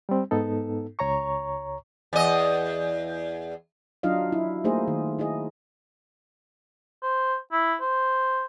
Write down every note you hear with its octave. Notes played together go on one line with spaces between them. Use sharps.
G3 C4
G#2 B3 D#4 A4
C#2 C#5 A#5 C#6
E2 D#5
F#3 D4 D#4 F4 D#5 F5
E4
A3 A#3 D#4 G#4 C5 D#5
D#3
D#4 E4 G#4 D#5
C5
E4
C5